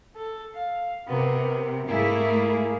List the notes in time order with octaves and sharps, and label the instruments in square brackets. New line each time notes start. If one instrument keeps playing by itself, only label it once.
[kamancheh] A4
F5
[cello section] C3 [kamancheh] B3 A#4
[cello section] G#2 A3 E4 [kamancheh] A#3 G#4